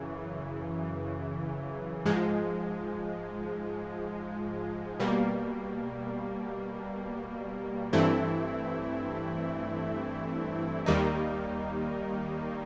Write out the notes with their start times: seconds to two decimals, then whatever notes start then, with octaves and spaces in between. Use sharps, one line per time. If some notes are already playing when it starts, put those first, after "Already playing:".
Already playing: F#2 C#3 E3
2.05 G#2 F3 G#3
5.00 B2 G3 A#3
7.93 G2 E3 A3 C4 E4
10.86 D#2 D#3 G3 A#3 D#4